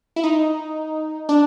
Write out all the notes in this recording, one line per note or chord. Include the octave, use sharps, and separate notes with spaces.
E4
D#4
D4